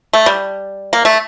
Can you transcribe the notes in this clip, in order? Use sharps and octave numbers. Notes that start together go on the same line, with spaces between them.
A3
G3
A#3
A3